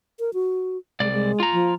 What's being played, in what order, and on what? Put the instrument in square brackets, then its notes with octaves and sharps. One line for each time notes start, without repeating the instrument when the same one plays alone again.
[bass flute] A#4
F#4
[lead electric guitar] C2 D5 [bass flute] G#3
[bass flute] G#3
[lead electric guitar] F4 A#5
[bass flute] F3